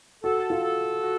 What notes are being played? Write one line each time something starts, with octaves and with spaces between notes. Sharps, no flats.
F#4 A4
F4
A4
F#4